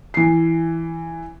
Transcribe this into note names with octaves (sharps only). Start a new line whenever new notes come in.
E3 C7